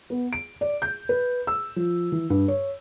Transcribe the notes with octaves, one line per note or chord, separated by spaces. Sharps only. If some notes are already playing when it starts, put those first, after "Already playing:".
B3
D7
D5
G6
B4
E6
F3
E3
G2
C#5